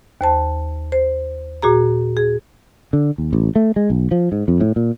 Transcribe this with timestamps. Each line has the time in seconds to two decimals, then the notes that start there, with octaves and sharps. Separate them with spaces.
0.21 D#2 C5 A5
0.92 C5
1.62 A#2 F#4 G#4 A#5
2.17 G#4
2.93 D3
3.18 D#2
3.33 A1
3.56 A3
3.76 G#3
3.90 B1
4.11 F3
4.32 G#2
4.48 F2
4.60 A2
4.76 A#2